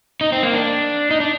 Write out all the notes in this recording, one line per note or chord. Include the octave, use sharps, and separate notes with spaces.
D#4
C4
A#3
D4
D#4
D4